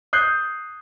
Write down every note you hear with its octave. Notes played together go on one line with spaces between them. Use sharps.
D#6 F#6 G6 C7